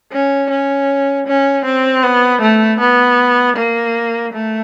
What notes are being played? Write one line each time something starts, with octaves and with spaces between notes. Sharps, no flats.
C#4
C#4
C#4
C4
B3
A3
B3
A#3
A3